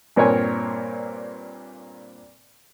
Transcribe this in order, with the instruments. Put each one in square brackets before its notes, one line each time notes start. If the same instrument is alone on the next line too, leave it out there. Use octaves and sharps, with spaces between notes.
[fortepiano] G2 A#2 C4 A#4 C#5 G#5